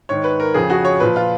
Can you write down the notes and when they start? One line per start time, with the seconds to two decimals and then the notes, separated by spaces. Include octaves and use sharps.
0.09 G#2 D#3 C#5
0.24 B4
0.40 A#4
0.54 F2 C#3 F3 G#4
0.70 F#4
0.85 C#5
1.00 A#2 F3 B4
1.16 F4